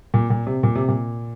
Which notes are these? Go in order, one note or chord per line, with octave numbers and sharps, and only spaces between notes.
A#2
A#2
C3
A#2
C3
A#2